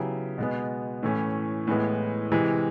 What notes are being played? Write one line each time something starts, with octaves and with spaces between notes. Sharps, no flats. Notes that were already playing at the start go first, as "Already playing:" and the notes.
Already playing: C#3 F#3 B3 E4 G4
B2 G#3 B3
A2 E3 A3 C#4
A2 E3 G#3 B3
C3 E3 G#3